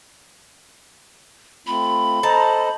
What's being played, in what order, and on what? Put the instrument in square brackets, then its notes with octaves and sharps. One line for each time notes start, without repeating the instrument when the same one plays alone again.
[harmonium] A3 C4 F4 [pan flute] B5
[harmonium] A4 C5 D#5 [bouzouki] A5 [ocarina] A#5